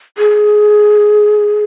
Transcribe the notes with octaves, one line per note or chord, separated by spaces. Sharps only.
G#4